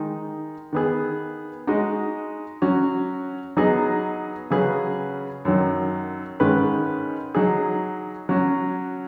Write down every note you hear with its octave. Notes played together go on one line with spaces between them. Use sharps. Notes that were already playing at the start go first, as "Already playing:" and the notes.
Already playing: D#3 G#3 D#4
D#3 B3 G#4
G#3 D#4 F#4 D#5
F#3 C#4 F#4
F#3 B3 D#4 G#4 D#5
C#3 F#3 C#4 G#4 B4
F#2 D#3 F#3
G#2 D#3 G#3 C#4 B4
F#3 D#4 G#4
F#3 C#4 F#4